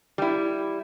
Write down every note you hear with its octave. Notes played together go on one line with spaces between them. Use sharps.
G3 E4